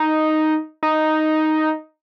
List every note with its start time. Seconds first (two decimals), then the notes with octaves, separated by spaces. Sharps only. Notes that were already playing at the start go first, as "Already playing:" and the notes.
Already playing: D#4
0.83 D#4